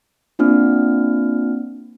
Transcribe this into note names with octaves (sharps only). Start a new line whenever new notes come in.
A#3 C4 D4 F4 F6